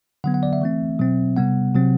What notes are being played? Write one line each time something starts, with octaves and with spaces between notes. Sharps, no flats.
D3 F#3 B3 F#5
F#5
D5
E5
E3 A3 C4
B2 F#3 C4
C3 G3 B3 F#5
C3 F#3 C4